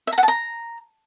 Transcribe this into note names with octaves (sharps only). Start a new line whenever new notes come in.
E5
A#5
F#5
A5
A#5